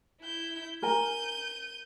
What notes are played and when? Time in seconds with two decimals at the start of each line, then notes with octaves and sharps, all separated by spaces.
0.21 E4 G6
0.82 A#4 G#5 A#5 G6 D#7